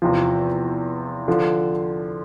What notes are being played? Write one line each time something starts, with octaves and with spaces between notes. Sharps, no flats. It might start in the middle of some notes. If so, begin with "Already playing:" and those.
E2 C3 F3
D3 F3